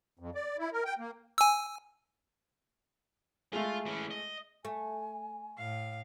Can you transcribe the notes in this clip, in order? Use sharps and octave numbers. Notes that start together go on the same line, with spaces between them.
F2
D5
E4
A#4
G5
A#3
G#5 E6
G#3 A3 F4
E3 C#4
D#5
A3 G#5
A2 F5